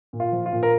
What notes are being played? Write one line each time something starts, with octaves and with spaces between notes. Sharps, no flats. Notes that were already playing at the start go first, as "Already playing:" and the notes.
A#2
F4
F3
F4
A#2
A#4